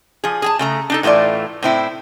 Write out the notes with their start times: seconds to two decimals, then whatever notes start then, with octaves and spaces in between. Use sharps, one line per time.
0.24 F3 G#4
0.42 G#4 G#5 A5
0.59 C#3 A3 A#5
0.90 D4 D#4 A4
1.03 A2 E3 A3 F4 D5
1.62 A2 C4 E4